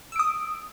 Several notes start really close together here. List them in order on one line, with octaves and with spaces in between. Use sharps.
E6 D7 D#6